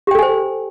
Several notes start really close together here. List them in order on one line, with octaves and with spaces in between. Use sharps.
G4 G5 A4 G#5 C5